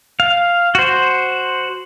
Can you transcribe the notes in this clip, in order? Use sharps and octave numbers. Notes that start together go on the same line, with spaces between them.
F5
F#4 C5